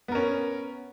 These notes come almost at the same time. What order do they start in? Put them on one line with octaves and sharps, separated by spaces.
B3 A#4 C#4